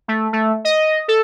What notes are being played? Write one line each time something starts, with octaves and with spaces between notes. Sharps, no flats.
A3
A3
D#5
A4